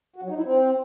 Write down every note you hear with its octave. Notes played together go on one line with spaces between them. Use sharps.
F#4
F#3
D#4
E4
C4